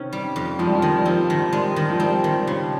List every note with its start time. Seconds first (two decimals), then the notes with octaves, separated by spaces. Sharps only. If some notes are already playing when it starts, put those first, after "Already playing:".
Already playing: C3 D#3 C#4
0.13 G3
0.36 F2
0.59 F3 G#3
0.67 G3
0.75 F3
0.82 D#3
0.98 G3
1.05 F3 C4
1.30 D#3
1.53 G3 G#3
1.76 D#3
1.90 F3
2.00 G3 C4
2.24 D#3
2.47 C#3